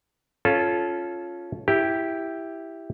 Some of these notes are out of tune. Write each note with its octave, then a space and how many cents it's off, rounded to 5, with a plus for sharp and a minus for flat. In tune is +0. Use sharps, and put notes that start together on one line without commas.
C#4 +0 F4 +0 A4 -20
E4 +0 G4 +0